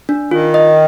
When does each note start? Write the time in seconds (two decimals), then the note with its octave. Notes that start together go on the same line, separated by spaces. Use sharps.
0.09 D4
0.31 D#3 F4
0.54 D#5